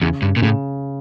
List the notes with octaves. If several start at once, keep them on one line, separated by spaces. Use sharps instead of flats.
E2 C#3
G2
A#2
A2 C#3